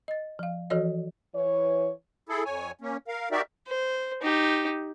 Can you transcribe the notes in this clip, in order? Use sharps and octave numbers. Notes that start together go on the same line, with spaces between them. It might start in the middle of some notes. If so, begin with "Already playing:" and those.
D#5 A6
F3 F5
E3 F3 F#4 A4 C#5 D#5
E3 C#5
E4 G#4 A4
F2 C#5 G#5
A#3 C#4
A#4 F5
D#4 F#4 G4 A#4 D5 E5
C5
D#4 G4